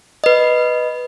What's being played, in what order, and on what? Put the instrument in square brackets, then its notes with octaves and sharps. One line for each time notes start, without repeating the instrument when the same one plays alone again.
[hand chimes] B4 D#5